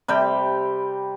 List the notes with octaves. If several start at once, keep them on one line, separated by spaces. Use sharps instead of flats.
C3 G3 G5